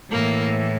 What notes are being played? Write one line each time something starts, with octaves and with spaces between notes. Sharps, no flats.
A2 E3 A#3